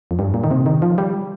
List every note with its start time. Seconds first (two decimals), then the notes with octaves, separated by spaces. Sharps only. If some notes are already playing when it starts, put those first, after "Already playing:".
0.11 F2
0.19 G2
0.34 A#2
0.44 D#3
0.51 C3
0.66 D#3
0.82 F3
0.98 G3